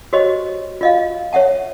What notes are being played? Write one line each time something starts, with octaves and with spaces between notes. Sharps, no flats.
F#4 G4 C5 C#5 D#5
F4 D#5 F5
C#5 E5 F#5 A5